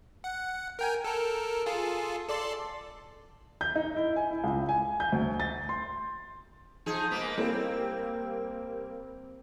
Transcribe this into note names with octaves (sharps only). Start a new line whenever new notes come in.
F#5
A#4 G5 G#5
A4 A#4
F4 G#4 A4
A4 D5 C6
G6
D#4
E4
G#5
E4
C#2
G#5
G6
D2
A6
C6
F3 D#4 G#4
G#3 A#3 B3
G3 A#3 C4